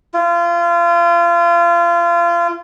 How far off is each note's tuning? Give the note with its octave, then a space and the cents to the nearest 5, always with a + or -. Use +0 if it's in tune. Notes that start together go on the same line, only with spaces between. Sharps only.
F4 -30